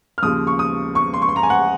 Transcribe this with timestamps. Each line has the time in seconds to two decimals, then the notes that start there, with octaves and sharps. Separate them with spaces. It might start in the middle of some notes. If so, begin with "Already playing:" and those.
0.18 F6
0.22 D#2 C#3 F3 D#6
0.47 C#6
0.59 D#6
0.95 C#6
1.14 C6
1.22 C#6
1.29 C6
1.36 A#5
1.43 G#5
1.50 F#5